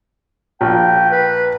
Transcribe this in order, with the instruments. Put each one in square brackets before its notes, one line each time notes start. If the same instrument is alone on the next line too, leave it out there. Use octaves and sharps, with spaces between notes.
[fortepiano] A#1 [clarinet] G5
[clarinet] B4